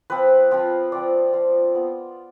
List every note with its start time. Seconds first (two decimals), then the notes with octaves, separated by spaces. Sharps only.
0.10 F3 C4 F4 B4
0.51 F3 C4 F4
0.92 F3 C4 F4 D5
1.33 F3 C4 F4
1.75 B3 F4